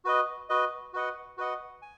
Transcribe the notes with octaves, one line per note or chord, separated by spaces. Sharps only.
F#4 B4 D#5
F#4 B4 D#5
F#4 B4 D#5 F#5
F#4 B4 D#5 F#5
G#5